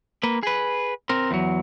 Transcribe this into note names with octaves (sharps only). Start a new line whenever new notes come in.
A#3 B4
G#4 B4
C4 A#4
E2 F#3